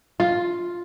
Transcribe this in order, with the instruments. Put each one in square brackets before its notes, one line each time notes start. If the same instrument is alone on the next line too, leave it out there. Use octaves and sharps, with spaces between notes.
[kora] F4